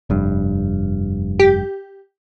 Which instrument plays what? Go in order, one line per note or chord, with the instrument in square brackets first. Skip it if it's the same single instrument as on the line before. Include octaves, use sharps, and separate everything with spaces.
[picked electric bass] F1 G2
[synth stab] G4